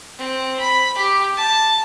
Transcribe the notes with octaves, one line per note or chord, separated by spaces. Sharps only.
C4
B5
G4
A5